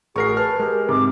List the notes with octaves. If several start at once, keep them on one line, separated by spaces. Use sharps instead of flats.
A1 F#4 G#4 A#4 C#6 C7
B4 G#5 A5 F6
G#3 G4 A#4
G#2 C3 D6